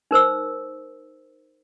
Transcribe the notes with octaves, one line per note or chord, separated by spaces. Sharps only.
D#4 A#4 C5 E6